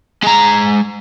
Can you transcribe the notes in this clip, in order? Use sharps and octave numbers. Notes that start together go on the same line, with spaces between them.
G#3 A#5